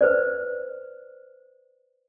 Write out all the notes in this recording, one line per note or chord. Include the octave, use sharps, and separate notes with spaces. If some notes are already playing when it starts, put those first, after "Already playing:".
B4 C5 D5